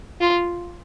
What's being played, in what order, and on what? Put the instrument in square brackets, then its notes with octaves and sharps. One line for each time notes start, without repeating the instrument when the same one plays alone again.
[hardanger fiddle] F4